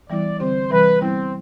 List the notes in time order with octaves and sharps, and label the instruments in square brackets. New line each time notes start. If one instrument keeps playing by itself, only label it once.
[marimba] E3 G3 B3 E4 [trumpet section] D5
[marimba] D3 G3 C4 G4 [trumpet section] C5
[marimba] C3 E3 G3 [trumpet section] B4
[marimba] G3 B3 E4 [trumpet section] C4